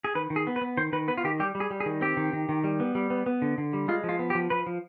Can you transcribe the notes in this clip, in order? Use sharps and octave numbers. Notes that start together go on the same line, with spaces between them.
G#4
D#3 B4
D#3
G#4
B3
B4
B3
D#3 C5
D#3 B4
B3 B4
F4
D#3 G4
G3 G4
G3
G#4
G3
G#4
D#3
C4 G4
D#3
D#3
D#3
G3
B3
G3
B3
B3
D3
D3
G3
G#3 F4
F3
F4
B3
G4
F3
F3 B4
F3